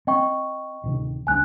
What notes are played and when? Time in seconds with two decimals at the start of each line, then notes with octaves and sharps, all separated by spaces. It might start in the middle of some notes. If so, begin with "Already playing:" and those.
0.07 C4 D#5 G5 C#6
0.84 D1 C3 D#3
1.27 C#2 A3 D4 G#5 F#6